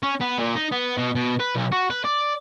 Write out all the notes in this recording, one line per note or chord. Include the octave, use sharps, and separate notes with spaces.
C#4
B3
A#2
D#4
B3
B2
B2
B4
B1
F#4
B4
D5